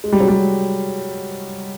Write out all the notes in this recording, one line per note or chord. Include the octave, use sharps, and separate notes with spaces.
G#3
G3
F#3
G3